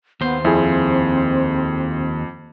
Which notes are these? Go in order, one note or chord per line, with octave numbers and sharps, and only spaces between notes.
D#2 B3 C5
F2 C4 E4 G#4